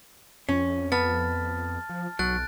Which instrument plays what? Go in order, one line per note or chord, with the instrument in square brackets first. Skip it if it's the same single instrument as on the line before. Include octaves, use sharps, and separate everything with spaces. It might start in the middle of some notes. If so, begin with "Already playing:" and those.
[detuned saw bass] F2 [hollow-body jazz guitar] C#4
[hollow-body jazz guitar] B3 [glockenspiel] A5 F6 A6
[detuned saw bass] F3
[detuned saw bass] B1 [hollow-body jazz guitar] F#3 [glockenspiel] F#6 A6 D7